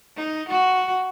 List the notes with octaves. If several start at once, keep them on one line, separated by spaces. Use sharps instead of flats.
D#4
F#4